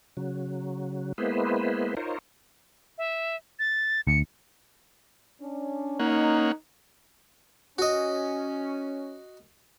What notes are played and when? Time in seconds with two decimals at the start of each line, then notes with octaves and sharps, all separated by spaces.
0.17 C#3 F#3
1.18 G#3 A#3 B3 E4 B4 C5
1.97 D#4 F4 A#4 C5 C#5
2.98 E5
3.59 A6
4.07 D2 C#7
5.41 C#4 D4
5.99 A#3 C#4 D#4 F#5
7.79 C#4 F#4 D#5